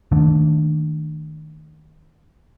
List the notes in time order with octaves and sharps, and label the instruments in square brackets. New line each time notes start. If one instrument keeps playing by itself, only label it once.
[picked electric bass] D#3 A3 A#3 D4